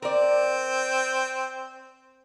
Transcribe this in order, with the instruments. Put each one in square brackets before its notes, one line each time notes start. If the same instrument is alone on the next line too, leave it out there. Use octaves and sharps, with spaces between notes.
[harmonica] C4 [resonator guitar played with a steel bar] A#4 D5